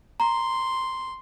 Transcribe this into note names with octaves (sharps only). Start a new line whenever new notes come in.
A#5 C6